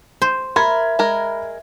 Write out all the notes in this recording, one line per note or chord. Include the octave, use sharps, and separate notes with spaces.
C5
A#4 E5 B5 G#6
G#3 A#4